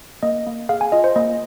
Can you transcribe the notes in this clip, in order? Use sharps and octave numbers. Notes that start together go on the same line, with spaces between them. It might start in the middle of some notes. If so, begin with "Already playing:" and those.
A#3 D#5
A#3
G#4 F5
G#5
F4 D#5
C5
A#3 D#5